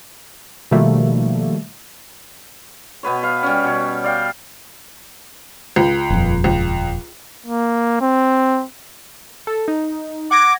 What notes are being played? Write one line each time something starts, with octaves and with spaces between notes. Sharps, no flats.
B2 D#3 F3 G3 A3 A#3
B2 B3 B4 C#5
B4 F5
G3 C#4
B2 C#5
D5 F5 G5
C#2
D#1 F2
C#2
A#3
C4
A4
D#4
F#5 D6 G#6 A#6